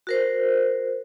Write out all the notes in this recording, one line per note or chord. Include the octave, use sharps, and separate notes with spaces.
F#4 A#4 C5